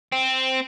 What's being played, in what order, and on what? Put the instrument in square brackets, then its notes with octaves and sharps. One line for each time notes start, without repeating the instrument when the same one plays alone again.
[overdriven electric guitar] C4